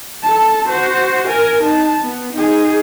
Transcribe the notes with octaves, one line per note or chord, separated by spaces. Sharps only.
A4 A5
F#4 C5
A#4 G#5
D#4 A5
B3
D#4 G#4